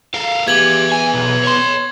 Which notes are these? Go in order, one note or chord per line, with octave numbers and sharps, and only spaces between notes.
A4 A#4 F5
B3 G4 G#4 G#6 F#7
G#5
B1
C#5 C6